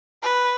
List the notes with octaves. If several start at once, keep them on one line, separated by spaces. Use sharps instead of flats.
B4